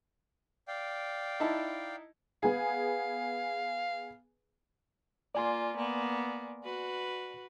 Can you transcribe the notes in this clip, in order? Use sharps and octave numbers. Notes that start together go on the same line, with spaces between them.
D5 F5 G5
D#4 E4 A5
B3 G#4 F5
A#3 F4 D5 G#5 C6
A#3 B3
F#4 B4